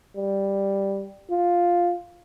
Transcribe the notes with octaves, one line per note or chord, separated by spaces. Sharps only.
G3
F4